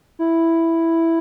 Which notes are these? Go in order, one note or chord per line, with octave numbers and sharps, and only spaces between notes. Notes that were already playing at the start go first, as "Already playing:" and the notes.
E4